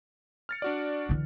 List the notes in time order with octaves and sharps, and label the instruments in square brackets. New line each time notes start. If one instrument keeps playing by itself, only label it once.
[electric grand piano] F6 A6 C#7
D4 F#4 D5
[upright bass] D3 E3